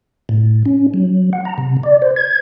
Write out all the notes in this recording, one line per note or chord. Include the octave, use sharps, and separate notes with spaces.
A2
C#4
F#3
F#5
A#5
C3
D5
C5
G#6